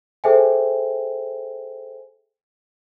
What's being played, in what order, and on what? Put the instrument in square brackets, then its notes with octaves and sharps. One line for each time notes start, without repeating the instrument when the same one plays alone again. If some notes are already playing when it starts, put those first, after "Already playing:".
[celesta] G#4 A4 C5 E5 G5 G#5